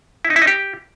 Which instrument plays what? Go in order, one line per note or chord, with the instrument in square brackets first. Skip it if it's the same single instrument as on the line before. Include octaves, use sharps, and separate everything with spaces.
[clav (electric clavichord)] E4
D#4
E4
D#4
G4